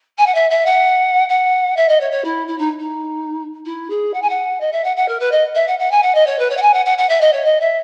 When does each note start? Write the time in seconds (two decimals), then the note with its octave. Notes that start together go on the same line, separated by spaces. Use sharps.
0.18 G#5
0.26 F#5
0.34 E5
0.50 E5
0.65 F#5
1.29 F#5
1.76 E5
1.88 D#5
2.00 C#5
2.11 C#5
2.24 E4
2.47 E4
2.58 D#4
2.79 D#4
3.65 E4
3.90 G#4
4.13 F#5
4.21 G#5
4.29 F#5
4.60 D#5
4.72 E5
4.84 F#5
4.96 F#5
5.08 A#4
5.19 B4
5.31 D#5
5.55 E5
5.67 F#5
5.79 F#5
5.91 G#5
6.02 F#5
6.14 D#5
6.26 C#5
6.38 B4
6.49 C#5
6.57 F#5
6.62 G#5
6.73 F#5
6.85 F#5
6.98 F#5
7.09 E5
7.20 D#5
7.32 C#5
7.45 D#5
7.60 E5